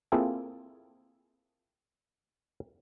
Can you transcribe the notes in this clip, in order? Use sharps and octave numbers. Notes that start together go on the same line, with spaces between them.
A#3 C4 E4 F4 G#4 A4